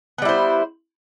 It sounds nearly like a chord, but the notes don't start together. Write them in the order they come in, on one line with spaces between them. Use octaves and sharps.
B3 G3 E4 C5